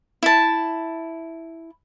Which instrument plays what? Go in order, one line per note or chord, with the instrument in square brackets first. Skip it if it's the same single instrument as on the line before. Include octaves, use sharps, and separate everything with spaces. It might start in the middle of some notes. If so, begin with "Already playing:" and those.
[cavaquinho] E4 A5